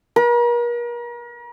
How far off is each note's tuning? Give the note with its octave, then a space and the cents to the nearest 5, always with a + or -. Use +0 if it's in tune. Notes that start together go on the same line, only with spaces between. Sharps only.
A#4 +40